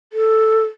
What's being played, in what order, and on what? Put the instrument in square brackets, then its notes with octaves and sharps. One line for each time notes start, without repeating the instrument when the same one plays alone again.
[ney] A4